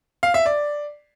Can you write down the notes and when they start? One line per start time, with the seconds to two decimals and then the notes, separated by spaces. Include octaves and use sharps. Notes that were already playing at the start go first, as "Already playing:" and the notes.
0.23 F5
0.34 E5
0.46 D5